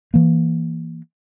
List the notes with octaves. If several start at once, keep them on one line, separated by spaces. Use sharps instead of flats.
E3 A#3